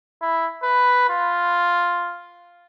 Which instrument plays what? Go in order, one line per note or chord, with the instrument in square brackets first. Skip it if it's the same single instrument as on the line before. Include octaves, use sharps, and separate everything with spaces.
[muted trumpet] E4
B4
F4